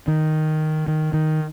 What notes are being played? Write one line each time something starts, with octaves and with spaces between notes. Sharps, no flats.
D#3
D#3
D#3